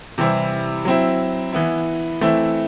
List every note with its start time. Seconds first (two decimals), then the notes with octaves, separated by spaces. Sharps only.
0.18 C3 E3 G3 C4 E4
0.85 F#3 C4 E4
1.53 E3 B3 E4
2.21 E3 A3 C4 E4